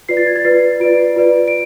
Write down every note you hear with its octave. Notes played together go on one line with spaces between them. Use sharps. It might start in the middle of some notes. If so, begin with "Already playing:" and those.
F4 B4 D5 C7
A6
G#6
A6
F4 B4 D5 C7
F4 B4 D5 D7
F4 B4 D5
D7